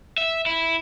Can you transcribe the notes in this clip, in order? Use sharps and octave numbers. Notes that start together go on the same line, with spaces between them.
E5
E4